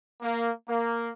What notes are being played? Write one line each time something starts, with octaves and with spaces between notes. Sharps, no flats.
A#3
A#3